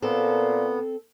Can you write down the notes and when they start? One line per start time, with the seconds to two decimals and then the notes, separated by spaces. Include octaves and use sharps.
0.02 A#2 B3 C4 A4